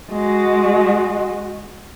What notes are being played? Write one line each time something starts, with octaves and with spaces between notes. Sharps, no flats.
G#3 F#4